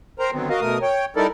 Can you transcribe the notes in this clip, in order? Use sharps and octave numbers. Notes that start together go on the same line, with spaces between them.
A#4 C5 G5 A#5
D3 D#3 F#3 B3 C4
F#4 A#4 D#5 F5
B2 A3 A#4 D#6
C#5 G5
G3 D#4 E4 A4 A#4 D5